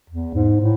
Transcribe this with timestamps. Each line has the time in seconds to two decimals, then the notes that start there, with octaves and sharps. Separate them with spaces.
0.10 E2
0.35 G#2
0.61 A2